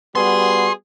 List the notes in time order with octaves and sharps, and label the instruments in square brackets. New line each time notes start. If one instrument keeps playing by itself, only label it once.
[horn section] G3 F#4 G#4 [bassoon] B3 [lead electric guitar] C6